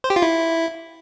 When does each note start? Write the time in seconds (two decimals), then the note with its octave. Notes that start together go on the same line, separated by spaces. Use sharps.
0.04 C5
0.10 G4
0.16 F4
0.22 E4